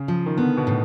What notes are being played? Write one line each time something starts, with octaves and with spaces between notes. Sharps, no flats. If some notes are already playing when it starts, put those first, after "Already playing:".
Already playing: C#3
F3
D#3
D3 B3
B2
A2